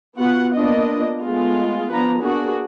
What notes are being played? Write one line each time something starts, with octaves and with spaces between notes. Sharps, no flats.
B3 F4 F#4 F#5
A#3 B3 D4 F4 D#5
G#3 A3 B3 F4
F3 B3 D4 B4 A#5
A#3 B3 D4 F#4 G#4